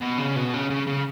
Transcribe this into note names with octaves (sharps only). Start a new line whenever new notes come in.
B2
C#3
B2
C#3
C#3
C#3